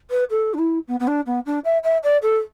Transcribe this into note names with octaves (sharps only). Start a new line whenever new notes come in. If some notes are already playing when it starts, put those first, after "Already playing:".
B4
A4
D4
E4
B3
B3
D4
B3
D4
E5
E5
D5
A4